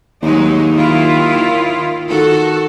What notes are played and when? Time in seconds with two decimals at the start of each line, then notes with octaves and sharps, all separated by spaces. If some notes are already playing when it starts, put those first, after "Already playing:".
0.23 D#2 F#3 G#3 D#4
0.73 D#3 E4 F4
2.10 D#3 F#4 A4